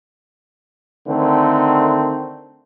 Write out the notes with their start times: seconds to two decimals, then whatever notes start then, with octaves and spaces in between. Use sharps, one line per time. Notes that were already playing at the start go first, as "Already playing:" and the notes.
1.08 D3 D#3 A3 C4